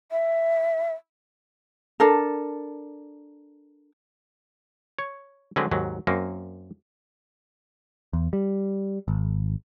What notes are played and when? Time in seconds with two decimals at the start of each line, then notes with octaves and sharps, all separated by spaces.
0.11 E5
2.00 D4 A4 A#4
4.99 C#5
5.56 D3 F#3 G#3 C4 B4
5.71 D#2 G#2 F#3
6.07 F#2 A#3 C4
8.13 E2
8.33 G3
9.08 G#1